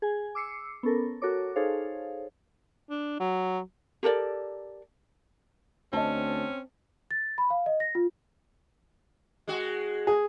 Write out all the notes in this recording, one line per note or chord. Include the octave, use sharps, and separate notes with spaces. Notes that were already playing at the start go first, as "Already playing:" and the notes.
G#4 G#5
D6 E6 C7 C#7
B3 C#4 A4 A#4
F#4 A4 A#4 C#5 D6
D#4 G#4 A4 C5 C#5 F5
D4
F#3
G4 A4 A#4 D5
D2 C4 C#4 D#5 A5
A6
B5
F5
D#5
A#6
F4
G#3 F#4
G#4